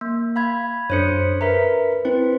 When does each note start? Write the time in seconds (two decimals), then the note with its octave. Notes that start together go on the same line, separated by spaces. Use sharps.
0.01 A#3
0.36 F5 B5 G#6
0.90 F#2 D4 A4 C5 C#5 C#7
1.41 A#4 B4 E5 A#5 B6
2.05 C4 E4 B4 C5